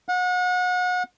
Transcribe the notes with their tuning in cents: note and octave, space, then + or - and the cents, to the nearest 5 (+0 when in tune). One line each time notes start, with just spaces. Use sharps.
F#5 -35